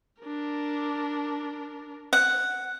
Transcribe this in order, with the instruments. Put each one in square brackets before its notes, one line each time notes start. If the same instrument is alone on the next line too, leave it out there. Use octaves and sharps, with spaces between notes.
[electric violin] D4 A#4
[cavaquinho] F#5